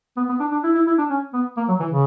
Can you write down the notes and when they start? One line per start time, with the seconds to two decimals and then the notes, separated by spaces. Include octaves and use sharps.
0.17 B3
0.29 B3
0.40 D4
0.51 D4
0.64 E4
0.75 E4
0.87 E4
0.98 D4
1.10 C#4
1.33 B3
1.57 A#3
1.68 F#3
1.80 E3
1.91 C#3